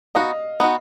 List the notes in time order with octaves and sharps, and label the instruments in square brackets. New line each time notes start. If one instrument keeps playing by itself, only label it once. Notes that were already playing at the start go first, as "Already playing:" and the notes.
[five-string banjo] B3 D#4 F#4 [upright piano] D#5 F5
[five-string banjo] B3 D#4 F#4